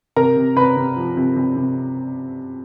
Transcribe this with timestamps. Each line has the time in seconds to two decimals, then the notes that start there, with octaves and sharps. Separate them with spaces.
0.16 C3 A#4 A#5
0.37 C3
0.56 C3 B4 B5
0.77 C3
0.97 F3
1.17 C3
1.36 C3
1.56 C3